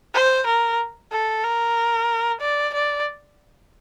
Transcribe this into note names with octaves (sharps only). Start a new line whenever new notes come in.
C5
A#4
A4
A#4
D5
D5